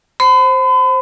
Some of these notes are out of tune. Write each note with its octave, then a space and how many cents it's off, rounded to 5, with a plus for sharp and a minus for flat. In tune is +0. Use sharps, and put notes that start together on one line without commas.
C5 +10 B5 +40